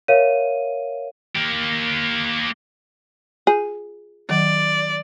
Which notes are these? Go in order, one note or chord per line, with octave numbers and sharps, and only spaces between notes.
A#4 C#5 E5 F5 D#7
A#3 G4
F4 G#4 G6
D#3 F#3 D5